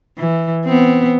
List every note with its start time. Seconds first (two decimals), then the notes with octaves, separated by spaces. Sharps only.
0.18 E3
0.66 B3 C4